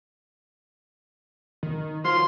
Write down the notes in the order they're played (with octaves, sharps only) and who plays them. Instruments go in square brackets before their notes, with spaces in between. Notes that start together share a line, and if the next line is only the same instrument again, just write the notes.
[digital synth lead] D#3
[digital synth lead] F#3 [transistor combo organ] F4 C5 [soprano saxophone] C6